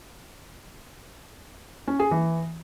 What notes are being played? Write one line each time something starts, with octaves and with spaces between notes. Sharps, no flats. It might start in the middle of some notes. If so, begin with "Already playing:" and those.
C#4
G#4
E3